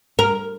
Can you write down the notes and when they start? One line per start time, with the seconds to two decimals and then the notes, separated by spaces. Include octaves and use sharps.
0.19 A#4